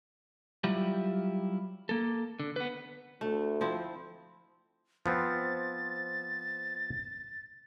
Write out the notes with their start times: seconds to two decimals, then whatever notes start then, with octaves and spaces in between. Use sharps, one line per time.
0.64 F#3 G3 E4 F4 G4
1.89 A#3 A4
2.40 D3
2.56 B3 B4
3.21 D2 A3
3.61 F3 C4 E4
5.06 F3 B3 C4 A6